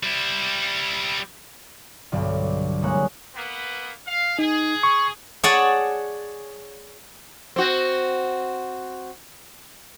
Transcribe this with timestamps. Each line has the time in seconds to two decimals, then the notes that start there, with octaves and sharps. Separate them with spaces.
0.03 G3 E4
2.12 B1 G2 D3
2.82 C2 G#3 A#3 C#5 F#6
3.35 A#3 B3 B4
4.07 F5
4.39 D#4 G#4
4.83 C#6
5.43 G#4 C#5 D5 F#5 G#5 A5
7.56 C4 F#4